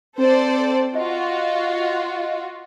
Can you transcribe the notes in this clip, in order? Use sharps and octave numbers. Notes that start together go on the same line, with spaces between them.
C4 A4 C5 D5
F4 F#4 D#5